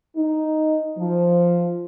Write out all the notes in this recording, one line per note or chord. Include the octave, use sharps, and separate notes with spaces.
D#4
F3